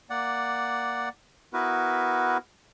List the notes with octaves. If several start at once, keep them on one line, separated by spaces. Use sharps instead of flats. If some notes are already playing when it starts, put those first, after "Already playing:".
A#3 D5 F#5
B3 E4 F#4 A#4 B4